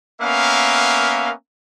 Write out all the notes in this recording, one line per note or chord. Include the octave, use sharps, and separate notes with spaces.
A#3 B3 C#4 A#4 E5 F5